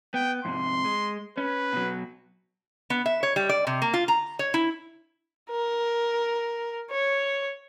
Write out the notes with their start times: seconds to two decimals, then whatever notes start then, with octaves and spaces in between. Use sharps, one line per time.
0.14 B3 G5
0.45 F2 G#2 C3 C6
0.85 G#3
1.37 C#4 B4
1.73 B2 F#3
2.90 B3
3.06 E5
3.23 C#5
3.36 G3
3.49 D5
3.67 C3
3.82 A#3
3.94 F4
4.08 A#5
4.39 C#5
4.54 E4
5.51 A#4
6.91 C#5